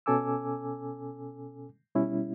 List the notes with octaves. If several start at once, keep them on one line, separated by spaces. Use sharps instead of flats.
B2 C#4 A4 G#5 D6 E6
B2 G3 C#4 E4